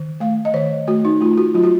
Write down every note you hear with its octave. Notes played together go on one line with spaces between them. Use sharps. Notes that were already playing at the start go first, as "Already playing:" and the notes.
Already playing: D#3
A3 F5
D#5
D#3 C#5
A3 F#4
D#4
A3 F4
F#4
F#3 F4
F#4